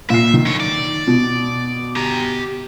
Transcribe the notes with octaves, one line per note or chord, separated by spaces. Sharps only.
A#2 E5 C7
D#3
D3 C#5
D5
B2
G4 A#5